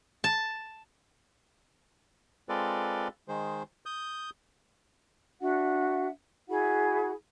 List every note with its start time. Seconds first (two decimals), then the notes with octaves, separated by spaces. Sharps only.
0.24 A5
2.49 G#3 C4 F4 A4 B4 D5
3.28 D#3 G#3 C5
3.86 D#6 G6
5.40 D4 F#4 E5 F#5
6.47 E4 F#4 G#4 F#5